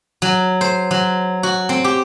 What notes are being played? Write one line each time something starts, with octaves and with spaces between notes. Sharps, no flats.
F#3
C5
F#3
F#4
C4
G4